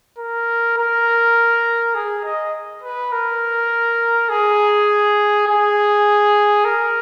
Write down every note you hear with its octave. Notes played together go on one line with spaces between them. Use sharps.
A#4
A#4
G#4
D#5
B4
A#4
G#4
G#4
A#4